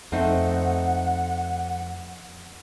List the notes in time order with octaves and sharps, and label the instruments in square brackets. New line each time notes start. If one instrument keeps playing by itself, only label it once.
[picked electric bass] F2 [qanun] A3 C4 D#4 [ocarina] F#5